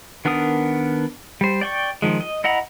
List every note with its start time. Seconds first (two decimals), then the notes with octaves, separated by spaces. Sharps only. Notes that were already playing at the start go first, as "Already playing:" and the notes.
0.25 D#3 B3 D4 A#4 D#6
1.41 G3 C5
1.61 D5 G5 C#6
2.02 D#3 F3 G#3
2.21 D#5
2.44 E4 D#5 F#5 A#5 B5